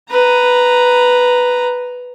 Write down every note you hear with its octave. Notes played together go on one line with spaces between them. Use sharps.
B4 A#5